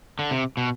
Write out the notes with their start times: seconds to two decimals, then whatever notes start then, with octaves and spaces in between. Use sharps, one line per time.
0.19 D3
0.31 C3
0.57 B2